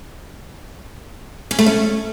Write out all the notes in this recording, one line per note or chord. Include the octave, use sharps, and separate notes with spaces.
C#4
A3
C#4